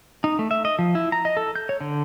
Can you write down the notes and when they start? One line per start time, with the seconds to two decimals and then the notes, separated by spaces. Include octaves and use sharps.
0.24 D#4
0.39 A3
0.51 E5
0.65 D#5
0.79 F3
0.95 E4
1.12 A#5
1.25 D#5
1.37 A4
1.56 G6
1.69 C#5
1.81 D3